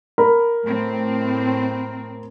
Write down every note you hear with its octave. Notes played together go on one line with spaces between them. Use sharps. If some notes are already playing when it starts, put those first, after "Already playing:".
A#4 B5
A2 C4